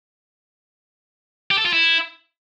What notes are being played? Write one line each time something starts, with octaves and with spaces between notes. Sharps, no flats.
G4
A4
F4
E4